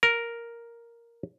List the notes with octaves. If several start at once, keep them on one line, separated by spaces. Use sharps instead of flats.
A#4